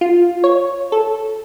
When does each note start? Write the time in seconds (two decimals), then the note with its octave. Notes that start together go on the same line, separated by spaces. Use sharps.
0.01 F4
0.44 C#5
0.92 A4